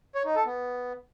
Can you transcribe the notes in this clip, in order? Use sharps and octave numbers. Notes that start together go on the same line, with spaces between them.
C#5
D#4
A4
B3